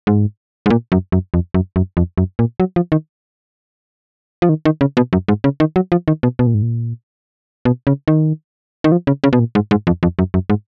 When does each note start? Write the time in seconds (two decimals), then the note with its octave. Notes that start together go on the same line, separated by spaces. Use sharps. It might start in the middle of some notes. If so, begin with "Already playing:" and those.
0.07 G#2
0.66 G#2
0.70 A#2
0.92 F#2
1.12 F#2
1.34 F2
1.54 F#2
1.76 F#2
1.97 F2
2.18 F#2
2.39 A#2
2.60 F#3
2.76 F3
2.92 D#3
4.42 F3
4.49 D#3
4.65 D#3
4.81 C#3
4.97 B2
5.13 F#2
5.28 G#2
5.44 C#3
5.60 D#3
5.76 F#3
5.92 F3
6.08 D#3
6.23 B2
6.39 B2
6.47 A#2
6.54 G#2
6.62 A#2
7.65 B2
7.87 C#3
8.08 D#3
8.84 D#3
8.92 F3
9.07 C#3
9.24 C#3
9.33 B2
9.39 A#2
9.55 G#2
9.71 G#2
9.87 F2
10.03 F2
10.19 F#2
10.34 F#2
10.50 G#2